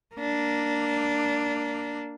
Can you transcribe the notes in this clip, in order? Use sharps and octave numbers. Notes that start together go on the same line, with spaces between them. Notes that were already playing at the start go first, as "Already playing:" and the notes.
A#3 D4